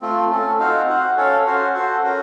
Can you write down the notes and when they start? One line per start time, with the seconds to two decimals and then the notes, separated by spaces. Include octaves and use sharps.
0.02 A3 C4 F4
0.30 A3 C#4 A4
0.58 C4 D#4 F#4 C5 F5
0.88 F#4 C5 F#5
1.17 C#4 A4 C#5 F5
1.45 C#4 F#4 C5
1.74 F#4 A4 C5
2.03 C#4 F#4 A#4